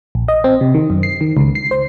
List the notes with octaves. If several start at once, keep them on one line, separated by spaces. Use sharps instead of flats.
A#1
D#5
C4
C3
D#3
F#2
C7
D#3
C#2
C7
C5